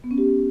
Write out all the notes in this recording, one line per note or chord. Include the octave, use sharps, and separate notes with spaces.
B3
C#4
G4